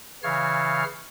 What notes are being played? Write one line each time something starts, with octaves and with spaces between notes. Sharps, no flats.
C#3 E3 C#5 F5 F6